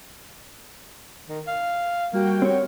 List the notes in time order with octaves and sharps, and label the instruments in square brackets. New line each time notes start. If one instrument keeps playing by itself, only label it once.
[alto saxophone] D#3
F5
[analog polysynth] G3 F#4 G5 [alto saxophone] A#3
[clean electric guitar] C4 C#5